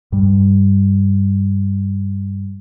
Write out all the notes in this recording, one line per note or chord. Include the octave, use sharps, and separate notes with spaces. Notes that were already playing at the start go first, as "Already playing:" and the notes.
G2 G3